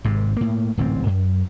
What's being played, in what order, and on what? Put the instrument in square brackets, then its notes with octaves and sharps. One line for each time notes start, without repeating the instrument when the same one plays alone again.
[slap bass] G#1 G#2 C3
A2 A#3
D1 A1 G#2 C4
F#2